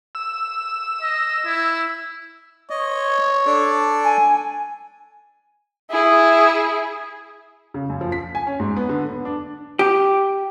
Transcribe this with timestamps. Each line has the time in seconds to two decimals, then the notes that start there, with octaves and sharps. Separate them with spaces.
0.15 E6
1.02 D#5
1.45 E4
2.70 C#5 D#5
3.46 D4 A4 D5
4.04 G#5
5.90 E4 G#4
7.74 C#3
7.89 F#2
8.01 F3
8.12 B6
8.35 G#5
8.47 C#4
8.60 G#2
8.77 B3
8.89 D3
9.09 B3
9.25 D4
9.79 G4